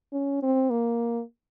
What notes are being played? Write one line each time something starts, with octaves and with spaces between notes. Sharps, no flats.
C#4
C4
A#3